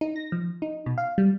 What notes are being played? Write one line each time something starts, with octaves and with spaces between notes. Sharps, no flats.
D#4
A#6
F3
D#4
B2
F5
G3